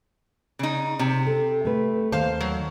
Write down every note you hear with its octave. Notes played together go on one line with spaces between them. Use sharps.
C#3 D#4
C3
A4
A3 B4
D#2 C5 F5 A5
F#3